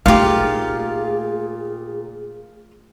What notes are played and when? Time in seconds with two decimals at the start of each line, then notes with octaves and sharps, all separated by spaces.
0.06 A#2 A3 D#4 F4 G4 F5
0.24 G#4